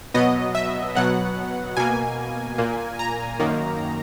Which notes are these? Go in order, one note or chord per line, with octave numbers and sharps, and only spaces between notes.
B2 F#3 B3 D#5
E5
B2 F#3 B3 F#5
B2 A#3 G#5
A#2 A#3
A#5
F#2 D#3 A#3